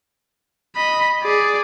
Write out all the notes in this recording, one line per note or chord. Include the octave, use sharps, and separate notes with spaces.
D#5 B5
G#4 D5